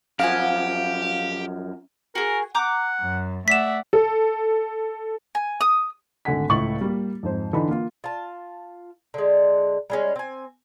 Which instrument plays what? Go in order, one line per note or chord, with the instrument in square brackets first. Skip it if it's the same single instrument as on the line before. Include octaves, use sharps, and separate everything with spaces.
[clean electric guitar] F#2 F3 [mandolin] F#4 F#5 G#5 [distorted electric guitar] G4 [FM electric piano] F5
[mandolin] F#4 G#4 [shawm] A#4
[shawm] F#5 [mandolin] A#5 D6 G6
[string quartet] F#2
[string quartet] A3 D5 F#5 [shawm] E5 [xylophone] B6 E7
[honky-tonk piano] A4
[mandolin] G#5
D#6
[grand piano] G#1 D3 A3 F#5 G#5 B6
C#2 A2 E4 C#6 A6 F#7
G3 A#3
F2 G#2 C5
D3 E3 D4 D#4 B5
A#3 F4
[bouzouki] F4 A5
D3 G#3
G3 G#3 C#4
C4 G#5